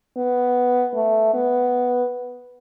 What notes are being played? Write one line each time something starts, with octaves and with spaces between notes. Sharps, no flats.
B3
A3
B3